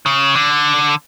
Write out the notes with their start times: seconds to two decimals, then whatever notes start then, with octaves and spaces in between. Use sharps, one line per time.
0.06 C#3
0.35 D3